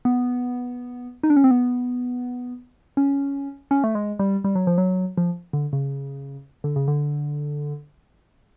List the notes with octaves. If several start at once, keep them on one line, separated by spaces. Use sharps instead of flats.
B3
D#4
D4
C#4
C4
B3
C#4
C#4
A3
G#3
G3
G3
F#3
F3
F#3
F3
D3
C#3
D3
C#3
D3